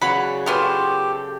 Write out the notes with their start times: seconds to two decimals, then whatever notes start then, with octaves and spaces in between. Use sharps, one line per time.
0.01 C#3 F#3 B4 C#5 D5 F#5 B5
0.46 B3 F4 G4 A4 C#5 C6